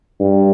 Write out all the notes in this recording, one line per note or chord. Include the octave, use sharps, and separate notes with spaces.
G2